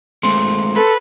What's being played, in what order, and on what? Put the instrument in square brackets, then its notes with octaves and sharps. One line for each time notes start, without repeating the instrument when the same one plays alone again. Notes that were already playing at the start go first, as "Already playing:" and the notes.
[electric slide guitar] G#3 A3 C4 [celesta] C6
[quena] A4 [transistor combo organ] B4